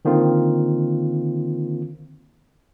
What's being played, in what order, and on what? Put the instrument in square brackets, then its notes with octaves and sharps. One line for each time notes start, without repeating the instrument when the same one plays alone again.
[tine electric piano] D3 D#3 A#3 C4 F4